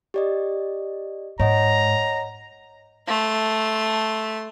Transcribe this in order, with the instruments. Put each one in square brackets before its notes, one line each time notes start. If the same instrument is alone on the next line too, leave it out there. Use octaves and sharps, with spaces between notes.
[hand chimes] G4 D5 D#5
[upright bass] G#2 [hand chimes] C#5 D#5 F#5 [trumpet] A#5
[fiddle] A3 C6